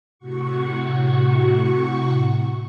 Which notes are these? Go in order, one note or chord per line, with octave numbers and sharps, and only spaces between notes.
A2 C3 F#4 C#6